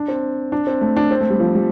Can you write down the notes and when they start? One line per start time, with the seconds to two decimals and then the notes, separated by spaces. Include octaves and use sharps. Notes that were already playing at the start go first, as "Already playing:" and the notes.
Already playing: D4
0.08 C4
0.52 D4
0.67 C4
0.81 A3
0.96 D4
1.11 C4
1.21 A3
1.30 G3
1.40 F3
1.55 G3